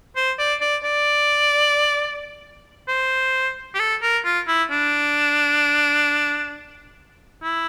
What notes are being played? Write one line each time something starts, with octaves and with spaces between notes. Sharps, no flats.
C5
D5
D5
D5
C5
G4
A4
A#4
F4
E4
D4
E4